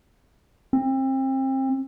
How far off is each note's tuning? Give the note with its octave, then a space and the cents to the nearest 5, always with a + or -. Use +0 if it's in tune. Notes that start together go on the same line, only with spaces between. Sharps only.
C4 +30